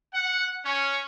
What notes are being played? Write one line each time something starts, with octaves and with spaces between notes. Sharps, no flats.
F#5
C#4